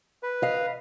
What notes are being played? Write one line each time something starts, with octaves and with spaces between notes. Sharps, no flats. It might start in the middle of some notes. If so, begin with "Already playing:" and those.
B4
D#5 F5